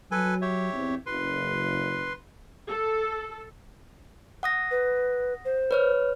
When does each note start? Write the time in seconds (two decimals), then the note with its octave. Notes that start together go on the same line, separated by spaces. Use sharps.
0.11 F#3 A4 B4 G#5
0.42 G4 C#5 E5
0.73 E2 C4
1.06 F#1 B4 C6
2.68 A4
4.43 F#5 D#6 A#6
4.71 B4
5.45 C5
5.71 B4 C#5 F6